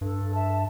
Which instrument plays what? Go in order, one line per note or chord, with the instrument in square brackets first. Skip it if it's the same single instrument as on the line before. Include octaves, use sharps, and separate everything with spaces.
[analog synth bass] G2 [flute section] A4
[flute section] E5 A5